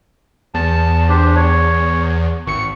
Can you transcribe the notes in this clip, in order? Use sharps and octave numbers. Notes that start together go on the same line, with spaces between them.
E2 A5
D4 G4 C5
C#5
G#1 C#6 C#7